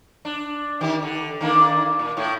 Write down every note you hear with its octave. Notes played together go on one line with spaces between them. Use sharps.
D4
D#3 G4
D3
D#3 A#3 D4
A#2
A2 E4